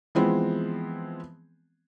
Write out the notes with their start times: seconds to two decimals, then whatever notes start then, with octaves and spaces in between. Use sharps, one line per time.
0.15 E3 F3 G#3 B3 C4